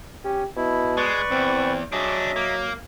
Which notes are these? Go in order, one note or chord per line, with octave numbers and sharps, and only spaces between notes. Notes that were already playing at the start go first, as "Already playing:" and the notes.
C#4 G4
B2 E4
G#3 B4 D5 C#6
E2 C4
F#3 D4 G#4 D#5 E5
A#3